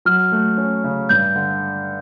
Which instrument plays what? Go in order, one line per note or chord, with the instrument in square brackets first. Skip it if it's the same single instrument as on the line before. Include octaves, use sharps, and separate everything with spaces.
[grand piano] F#3 [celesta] F6
[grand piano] A3
C#4
C#3
[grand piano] G2 [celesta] G6
[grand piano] D3